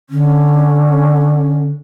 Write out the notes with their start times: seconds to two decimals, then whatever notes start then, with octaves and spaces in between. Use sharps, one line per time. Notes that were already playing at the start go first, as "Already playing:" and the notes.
0.10 D3 C#4